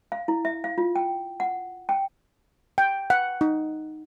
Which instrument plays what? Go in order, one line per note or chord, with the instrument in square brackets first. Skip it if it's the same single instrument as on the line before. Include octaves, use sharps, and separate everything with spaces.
[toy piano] F5
E4
E5
F5
F4
G5
F#5
G5
[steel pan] G5
F#5
D#4